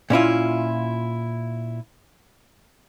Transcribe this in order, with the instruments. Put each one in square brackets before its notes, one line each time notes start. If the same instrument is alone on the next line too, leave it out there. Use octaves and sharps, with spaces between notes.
[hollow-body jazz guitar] A#2 C#4 E4 F4